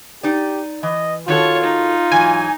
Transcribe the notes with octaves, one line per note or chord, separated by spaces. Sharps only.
D#4 G4 D5
E3 D#5
D#3 F4 F#4 A4 C#5
D#4
G#2 E3 F#3 G#5